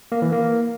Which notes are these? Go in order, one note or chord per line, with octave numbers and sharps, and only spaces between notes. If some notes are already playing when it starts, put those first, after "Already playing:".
A#3
E3
A#3